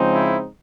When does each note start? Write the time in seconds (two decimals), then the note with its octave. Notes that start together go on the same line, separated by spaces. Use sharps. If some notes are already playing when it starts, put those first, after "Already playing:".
Already playing: C#3 F3 G#3 C4 D#4
0.12 E4